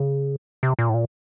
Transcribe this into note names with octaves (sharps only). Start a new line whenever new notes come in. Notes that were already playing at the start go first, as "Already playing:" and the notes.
Already playing: C#3
C3
A#2
A2
A#2